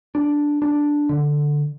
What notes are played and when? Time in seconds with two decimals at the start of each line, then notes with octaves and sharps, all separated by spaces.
0.15 D4
0.62 D4
1.09 D3